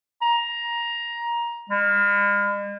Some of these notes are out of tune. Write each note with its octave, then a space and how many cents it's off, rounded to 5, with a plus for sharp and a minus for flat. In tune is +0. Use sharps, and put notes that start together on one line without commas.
A#5 +15
G#3 -45